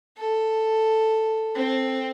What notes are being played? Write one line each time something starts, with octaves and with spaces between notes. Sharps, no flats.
A4
C4